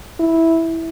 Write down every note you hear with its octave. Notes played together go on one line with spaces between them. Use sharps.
E4